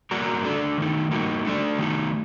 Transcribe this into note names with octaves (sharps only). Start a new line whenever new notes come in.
G3 A#3 F#4 A#4 D5
A3 D4 A4 D5
D#3 A3 D#4
G3 A#3 D#4 F#4
A3 D4 F#4 A4 D5
D#3 A3 D#4